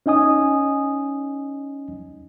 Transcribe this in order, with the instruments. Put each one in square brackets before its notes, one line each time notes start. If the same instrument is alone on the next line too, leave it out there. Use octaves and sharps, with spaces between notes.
[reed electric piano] C#4 D#4 D#5 G#5 D#6